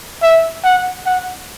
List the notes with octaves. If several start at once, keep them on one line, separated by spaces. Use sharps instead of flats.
E5
F#5
F#5